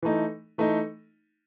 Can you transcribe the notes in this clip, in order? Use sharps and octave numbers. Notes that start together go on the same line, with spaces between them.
E3 A3 D#4
E3 A3 D#4